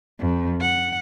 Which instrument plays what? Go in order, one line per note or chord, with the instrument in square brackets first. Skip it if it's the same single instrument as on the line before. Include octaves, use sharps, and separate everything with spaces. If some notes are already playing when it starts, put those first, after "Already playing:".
[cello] F2
F#5